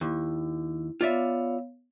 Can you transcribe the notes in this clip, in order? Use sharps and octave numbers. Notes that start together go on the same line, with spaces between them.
D#2 E4
B3 F4 C#5 D5 E5 F5